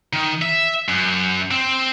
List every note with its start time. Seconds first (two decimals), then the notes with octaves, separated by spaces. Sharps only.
0.13 D#3
0.42 E5
0.89 F#2
1.51 C4